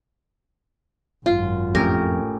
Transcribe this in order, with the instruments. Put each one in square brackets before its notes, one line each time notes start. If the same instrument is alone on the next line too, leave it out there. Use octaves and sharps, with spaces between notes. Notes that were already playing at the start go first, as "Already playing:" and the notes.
[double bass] G#1 F#2 [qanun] F4
[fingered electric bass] F2 [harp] A2 C#4 G4 [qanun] A#4